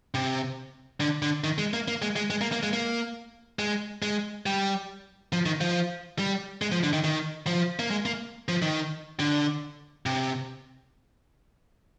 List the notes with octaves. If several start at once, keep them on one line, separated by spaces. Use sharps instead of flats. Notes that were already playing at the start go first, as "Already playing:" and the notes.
C3
D3
D3
D#3
G#3
A#3
A#3
G#3
G#3
G#3
A#3
A#3
G#3
A#3
G#3
G#3
G3
F3
D#3
F3
G3
G#3
F3
D3
D#3
D#3
F3
A#3
G#3
A#3
F3
D#3
D3
C3